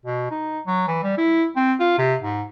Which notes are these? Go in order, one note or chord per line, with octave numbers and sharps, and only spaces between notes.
B2
D#4
F#3
E3
G3
E4
C4
F4
C3
G#2